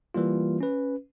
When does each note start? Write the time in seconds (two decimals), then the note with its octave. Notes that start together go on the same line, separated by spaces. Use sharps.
0.14 E3 G3 A#3 F4
0.61 C#4 B4